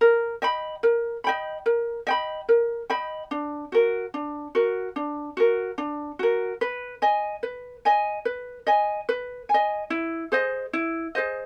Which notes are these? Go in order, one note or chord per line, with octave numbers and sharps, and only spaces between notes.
A#4
D#5 G5 B5
A#4
D#5 G5 B5
A#4
D#5 G5 B5
A#4
D#5 G5 B5
D4
F#4 A#4
D4
F#4 A#4
D4
F#4 A#4
D4
F#4 A#4
B4
D#5 G#5
B4
D#5 G#5
B4
D#5 G#5
B4
G#5
D#5
E4
G#4 C5 D#5
E4
G#4 C5 D#5